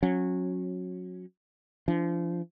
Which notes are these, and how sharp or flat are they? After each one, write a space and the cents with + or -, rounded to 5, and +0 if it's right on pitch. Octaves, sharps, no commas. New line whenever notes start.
F#3 -20 C#4 -20
F3 -30 D4 +0